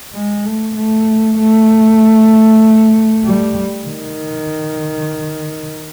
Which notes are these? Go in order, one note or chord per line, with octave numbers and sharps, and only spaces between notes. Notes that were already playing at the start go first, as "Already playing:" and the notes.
G#3
A3
A3
A3
G3
D#3